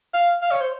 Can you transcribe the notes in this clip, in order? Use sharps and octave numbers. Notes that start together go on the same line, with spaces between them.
F5
F5
C#5
C5